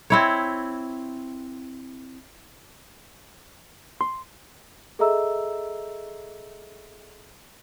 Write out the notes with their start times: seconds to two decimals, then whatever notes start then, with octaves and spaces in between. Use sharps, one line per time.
0.10 C4 E4 C#5
4.01 C6
4.99 G#4 A4 D#5 E5 A#5 E6